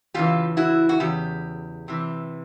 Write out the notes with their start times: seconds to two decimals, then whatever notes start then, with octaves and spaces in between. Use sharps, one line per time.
0.14 E2 C#3 E3 F4 G4
0.57 E4 F#4
0.89 F#4
1.00 E2 C#3 G4
1.88 C3 E3